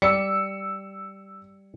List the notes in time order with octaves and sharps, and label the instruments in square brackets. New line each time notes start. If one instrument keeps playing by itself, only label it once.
[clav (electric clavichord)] G3 D5 [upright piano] E6 C#7